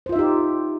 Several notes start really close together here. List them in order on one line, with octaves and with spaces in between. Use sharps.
C5 F4 E5 D#4 G4